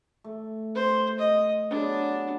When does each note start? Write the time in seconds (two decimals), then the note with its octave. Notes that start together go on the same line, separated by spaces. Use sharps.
0.24 A3
0.75 C5
1.19 D#5
1.71 F#3 B3 D4 G#4